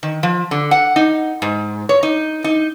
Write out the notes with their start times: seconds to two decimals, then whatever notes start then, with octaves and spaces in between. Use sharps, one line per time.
0.03 D#3
0.23 F3
0.51 D3
0.71 F#5
0.96 D#4
1.42 G#2
1.89 C#5
2.03 D#4
2.44 D#4